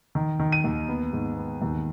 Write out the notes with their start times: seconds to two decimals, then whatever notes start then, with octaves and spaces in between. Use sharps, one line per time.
0.15 D#3
0.40 D#3
0.52 D#7
0.64 D#2
0.89 B3
1.13 G#2
1.37 B3
1.62 D#2